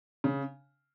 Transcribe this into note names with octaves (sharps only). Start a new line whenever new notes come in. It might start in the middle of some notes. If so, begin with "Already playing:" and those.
C#3